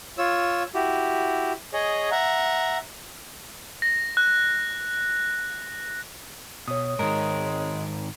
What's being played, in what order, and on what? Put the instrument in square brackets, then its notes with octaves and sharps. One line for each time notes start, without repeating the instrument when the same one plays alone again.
[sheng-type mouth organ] F4 C#5 E6
E4 F#4 G4
G#4 C#5 D#5
E5 F#5 A#5
[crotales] A#6
F#6
[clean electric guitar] B2 [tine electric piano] C#5 D#6
[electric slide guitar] G#2 D#3 [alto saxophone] G#3 [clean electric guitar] A#4